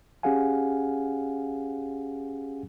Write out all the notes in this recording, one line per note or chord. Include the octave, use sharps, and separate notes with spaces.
C#4 G4 G#4 F5 F#5 G#5